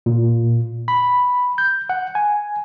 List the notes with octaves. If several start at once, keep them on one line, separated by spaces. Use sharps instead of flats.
A#2
B5
G6
F#5
G#5